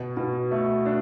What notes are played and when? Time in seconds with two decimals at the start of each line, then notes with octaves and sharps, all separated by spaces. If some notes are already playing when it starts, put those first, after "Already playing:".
Already playing: B2
0.17 B2
0.51 A3
0.86 D4